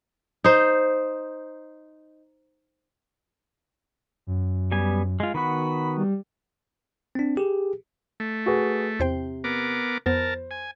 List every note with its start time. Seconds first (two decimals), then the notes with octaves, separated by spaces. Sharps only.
0.44 D#4 C5
4.27 F#2
4.72 G3 B3 G#5
5.20 G#3 F4
5.34 D#3 B3 F#4 B5
5.97 G3
7.15 C4 D4
7.37 G4 G#4
8.20 A3
8.46 F#4 G#4 B4
9.00 E2 C3 C5 G5
9.44 B3 A#4 D6
10.06 F2 B3 A#4 C5 A5
10.51 G#5